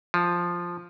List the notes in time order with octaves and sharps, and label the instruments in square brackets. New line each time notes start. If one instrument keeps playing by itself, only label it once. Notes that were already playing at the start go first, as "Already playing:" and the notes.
[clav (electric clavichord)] F3